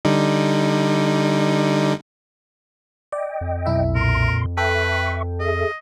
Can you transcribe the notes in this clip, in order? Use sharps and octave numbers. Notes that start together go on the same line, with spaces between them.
D3 G3 D#4
D5 D#5 G5
F2
B1 E4 E5
A#2 A#4 C6
A4 B4 E5 G5 C#6
G#4 A4 D#5 E5